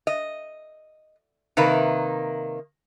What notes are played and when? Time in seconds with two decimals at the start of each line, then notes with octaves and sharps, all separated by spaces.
0.07 D#5
1.57 C3 D#3 A#3 B4